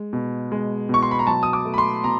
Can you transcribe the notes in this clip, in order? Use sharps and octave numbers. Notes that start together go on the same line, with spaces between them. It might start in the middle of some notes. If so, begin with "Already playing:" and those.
Already playing: G#3
B2
G#3
B2 C#6
C6
B5
A#5
F#3 A5
D#6
D6
A3
B5
C6
B2 A#5